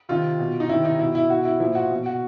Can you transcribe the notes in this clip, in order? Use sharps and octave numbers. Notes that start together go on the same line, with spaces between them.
C3 D#3 F4
B2
D#4
C3 D#3 E4
D#4
B2 E4
E4
B2 F#4
E4
A#2 F3 E4
F#4
B2
F#4